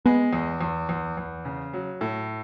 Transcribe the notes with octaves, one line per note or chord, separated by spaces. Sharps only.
G#3 B3
E2
E2
E2
E2
C#3
F#3
A2